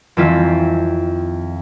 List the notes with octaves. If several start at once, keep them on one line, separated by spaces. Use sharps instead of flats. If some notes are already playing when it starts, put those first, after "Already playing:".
F2 D#3 E3 C4 F4 B6